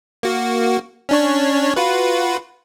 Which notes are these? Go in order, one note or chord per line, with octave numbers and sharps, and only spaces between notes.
A#3 F#4
C#4 D4 C#5
F4 F#4 B4